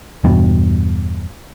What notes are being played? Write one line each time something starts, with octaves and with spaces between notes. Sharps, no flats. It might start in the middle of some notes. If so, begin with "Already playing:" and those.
E2 G2 B2